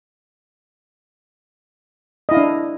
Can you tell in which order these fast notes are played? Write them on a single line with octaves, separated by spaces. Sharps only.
D#5 E4 F5 D4